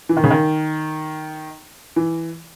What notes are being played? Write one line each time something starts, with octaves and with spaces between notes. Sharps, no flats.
E3
D#3
C#3
D#3
E3